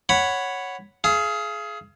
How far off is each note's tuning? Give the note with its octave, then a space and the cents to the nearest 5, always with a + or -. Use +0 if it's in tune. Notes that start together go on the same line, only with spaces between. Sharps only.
C#5 +0 F#5 +0 B5 +5
G#4 +25 F5 -30